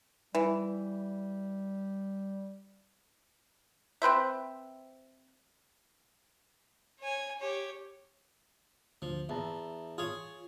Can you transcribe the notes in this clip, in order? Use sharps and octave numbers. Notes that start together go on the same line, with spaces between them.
E3 G3
C4 B4 C5 E5
C#5 G#5
G4 C#5
D2 F3
E2 E5 A5 A#5
F4 G#4 C#5